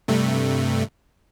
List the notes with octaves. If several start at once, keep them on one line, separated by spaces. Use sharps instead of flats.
G2 C3 A3